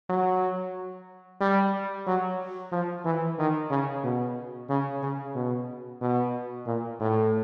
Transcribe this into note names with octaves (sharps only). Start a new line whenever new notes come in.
F#3
G3
F#3
F3
E3
D#3
C#3
B2
C#3
C#3
B2
B2
A#2
A2